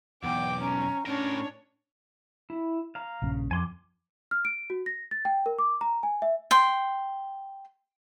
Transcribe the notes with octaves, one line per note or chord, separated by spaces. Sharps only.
B1 E2 F#5 G5 D6
C#4 A#5
A2 C#4 D4 A#4 C#5
E4
F5 A#5
A#1 G2 C#3
F2 G#5 C6 D6
F6
D7
F#4
A#6
A6
G5
A#4
D6
A#5
G#5
E5
G5 C6